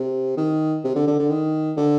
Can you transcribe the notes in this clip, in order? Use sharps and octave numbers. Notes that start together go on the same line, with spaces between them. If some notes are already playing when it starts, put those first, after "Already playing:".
Already playing: C3
D#3
C3
D3
D3
D3
D#3
D3